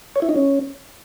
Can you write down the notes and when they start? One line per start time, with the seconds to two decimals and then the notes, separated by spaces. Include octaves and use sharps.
0.16 C#5
0.22 E4
0.29 D#4
0.36 C#4